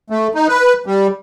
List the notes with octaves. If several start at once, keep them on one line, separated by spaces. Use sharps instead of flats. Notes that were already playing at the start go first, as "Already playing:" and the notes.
A3
D#4
B4
G3